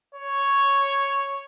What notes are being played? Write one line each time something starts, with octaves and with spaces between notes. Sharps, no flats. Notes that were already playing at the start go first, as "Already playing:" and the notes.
C#5